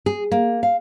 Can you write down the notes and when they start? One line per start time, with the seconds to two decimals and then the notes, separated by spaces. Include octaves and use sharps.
0.06 G#4
0.32 A#3
0.63 F5